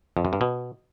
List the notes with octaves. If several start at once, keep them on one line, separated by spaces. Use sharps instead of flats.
F2
F#2
G2
B2